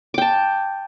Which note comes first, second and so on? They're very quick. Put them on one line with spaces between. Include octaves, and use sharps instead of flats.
D6 G5 A5